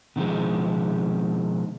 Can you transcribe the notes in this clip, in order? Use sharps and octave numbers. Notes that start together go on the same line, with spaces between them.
B2 D#3 F3 G#3